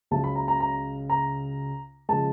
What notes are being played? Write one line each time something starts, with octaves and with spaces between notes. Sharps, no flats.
C#2 C#3 F#3 A5
B5
A#5
A#5
A#5
A#5
C#3 F3 G#3 A5